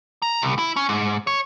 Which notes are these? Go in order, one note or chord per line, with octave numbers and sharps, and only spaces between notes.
A#5
C2
E4
C#4
G#2
C#5